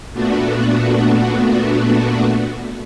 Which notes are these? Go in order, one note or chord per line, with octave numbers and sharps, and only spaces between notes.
A#2 A3 B3 D4 F#4